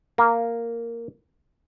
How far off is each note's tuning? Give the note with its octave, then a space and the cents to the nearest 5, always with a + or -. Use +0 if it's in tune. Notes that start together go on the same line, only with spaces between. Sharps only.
A#3 -5